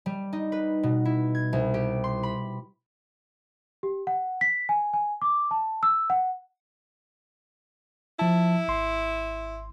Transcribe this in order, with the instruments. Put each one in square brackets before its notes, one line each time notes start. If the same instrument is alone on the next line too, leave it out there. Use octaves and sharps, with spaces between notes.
[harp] G3
D#4
B4
B2
E4
G#6
C2
G4
C6
B5
[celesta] G4
F#5
B6
G#5
G#5
D6
A5
E6
F#5
[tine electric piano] F3 A5 [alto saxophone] E4
[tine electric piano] G#1 C6